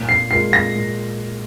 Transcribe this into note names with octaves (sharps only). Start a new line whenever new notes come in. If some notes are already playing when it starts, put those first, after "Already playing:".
Already playing: A#2
C7
G#3 F4 A#4 C7
A#6
A#2